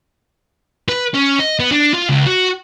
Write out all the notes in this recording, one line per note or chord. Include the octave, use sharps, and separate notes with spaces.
B4
C#4
D#5
B3
D4
F4
C#2
F#4